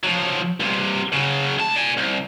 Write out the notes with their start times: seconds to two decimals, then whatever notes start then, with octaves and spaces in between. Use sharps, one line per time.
0.04 F3 F#3
0.60 G2 C3
1.13 C#3 F#3
1.58 D2 A5
1.76 D5 G#5
1.97 C2